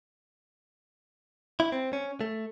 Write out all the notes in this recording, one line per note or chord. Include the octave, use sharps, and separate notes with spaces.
E4
C4
C#4
A3